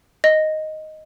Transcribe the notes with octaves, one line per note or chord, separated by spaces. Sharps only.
D#5